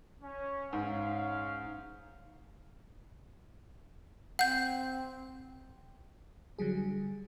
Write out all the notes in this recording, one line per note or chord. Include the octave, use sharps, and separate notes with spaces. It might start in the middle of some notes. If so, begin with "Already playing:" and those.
C#4
G#2 C#4 F5
C4 F#5 G6
D3 F#3 G3 G#4